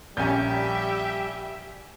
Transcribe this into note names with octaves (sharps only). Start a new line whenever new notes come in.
A#1 G3 C#4 G4 E5 G#5 A#5 G6